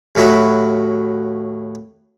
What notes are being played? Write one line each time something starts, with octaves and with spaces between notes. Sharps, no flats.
D#2 A2 F#3 E4 F#4